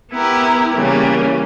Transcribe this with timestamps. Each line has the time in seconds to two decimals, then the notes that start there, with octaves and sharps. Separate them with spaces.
0.12 B3 E4 G4 A#4
0.73 C#3 E3 G3 A#3 C#4